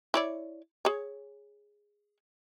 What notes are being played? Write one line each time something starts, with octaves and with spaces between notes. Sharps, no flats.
E4 C#5 D5
G#4 C#5